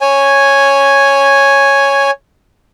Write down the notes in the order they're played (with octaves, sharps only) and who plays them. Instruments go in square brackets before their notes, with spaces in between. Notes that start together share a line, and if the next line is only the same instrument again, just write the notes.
[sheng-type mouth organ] C#5 G#5